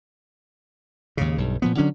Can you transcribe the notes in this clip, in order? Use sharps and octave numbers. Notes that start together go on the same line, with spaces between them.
D#2 G#2 C#3
B1 G2
A#2 F3 B3
D3 F#3 C#4 D4